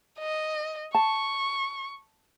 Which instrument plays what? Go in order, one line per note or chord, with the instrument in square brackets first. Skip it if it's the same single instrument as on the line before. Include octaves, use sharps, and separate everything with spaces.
[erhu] D#5
[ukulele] A5 [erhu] C#6